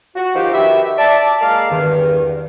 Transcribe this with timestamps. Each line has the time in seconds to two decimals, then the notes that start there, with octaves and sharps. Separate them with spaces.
0.16 F#4
0.34 D#3 F3 D#4 G4
0.53 D#3 F#4 G4 B4 E5
0.98 D5 E5 A5
1.41 G#3 A#3 A#4 D5 F5
1.70 E2 G2 D#3